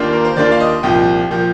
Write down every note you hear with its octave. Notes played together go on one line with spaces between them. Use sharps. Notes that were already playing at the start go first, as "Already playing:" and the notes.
Already playing: D#2 D#3 A#3 D4 F4
A#4
C5
D#2 D#3 A#3 D4 F4 D5
F5
D#5
C2 A#2 F3 G5
A#2 F3